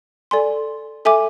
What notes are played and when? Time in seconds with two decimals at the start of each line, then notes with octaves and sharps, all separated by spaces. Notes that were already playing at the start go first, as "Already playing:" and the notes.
0.31 A4 D5 G#5 C6
1.05 A4 E5 G#5 D6